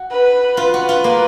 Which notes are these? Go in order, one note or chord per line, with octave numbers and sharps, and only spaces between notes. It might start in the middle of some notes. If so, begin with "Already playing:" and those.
Already playing: F#4
B4
F4 B4
F#4
F4
A#3